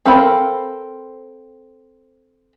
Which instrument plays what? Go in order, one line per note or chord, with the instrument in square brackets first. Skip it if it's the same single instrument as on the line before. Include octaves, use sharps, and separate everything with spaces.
[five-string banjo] C4 A4 A#4 F5 B5